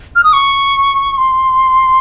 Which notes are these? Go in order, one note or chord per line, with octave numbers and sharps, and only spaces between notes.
F6
D#6
C#6
C6